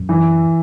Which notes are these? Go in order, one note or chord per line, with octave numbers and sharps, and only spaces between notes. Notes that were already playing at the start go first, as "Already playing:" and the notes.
Already playing: F#2
E3